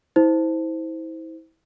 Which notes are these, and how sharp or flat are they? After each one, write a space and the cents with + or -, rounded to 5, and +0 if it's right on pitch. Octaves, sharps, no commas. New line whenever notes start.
E4 -30 C5 -10